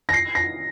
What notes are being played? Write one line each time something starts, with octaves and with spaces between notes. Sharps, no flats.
A#6
C7
A#6